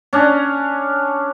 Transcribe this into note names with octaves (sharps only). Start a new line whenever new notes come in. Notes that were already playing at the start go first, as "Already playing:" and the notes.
C#4 D4